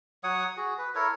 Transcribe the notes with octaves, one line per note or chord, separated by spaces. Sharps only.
F#3 C#5 F#5 D#6
F#4 G#4
B4
E4 A4 A#4 C#5